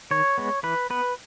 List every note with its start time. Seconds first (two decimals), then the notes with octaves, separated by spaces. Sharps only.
0.11 D#3 C#5
0.38 G#3 B3
0.63 E3 B4
0.90 B3 B4